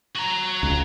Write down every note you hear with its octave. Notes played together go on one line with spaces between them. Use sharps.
F#4 A#5
C#2